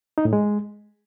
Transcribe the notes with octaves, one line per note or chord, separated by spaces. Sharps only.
D#4
A2
G#3